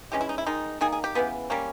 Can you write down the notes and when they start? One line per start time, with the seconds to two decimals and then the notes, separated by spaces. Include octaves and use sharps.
0.12 E3 G#3 C#4 G4
0.21 E4
0.29 D#4
0.38 E4
0.46 D#3 G#3 D#4
0.81 D#3 A#3 D#4 G#4
0.92 G#4
1.04 G4
1.15 C#3 E3 G3 B3
1.50 G3 A#3 C#4